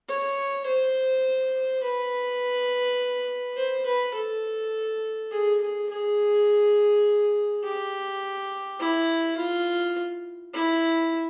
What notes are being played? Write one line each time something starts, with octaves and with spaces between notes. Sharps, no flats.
C#5
C5
B4
C5
B4
A4
G#4
G#4
G#4
G4
E4
F4
E4